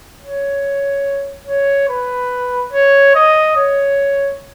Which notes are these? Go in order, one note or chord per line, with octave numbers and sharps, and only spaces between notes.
C#5
C#5
B4
C#5
D#5
C#5